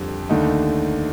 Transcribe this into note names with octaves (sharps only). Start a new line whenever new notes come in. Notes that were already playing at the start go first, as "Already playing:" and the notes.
Already playing: F2 D3 G3
D#2 D3 A3 D#4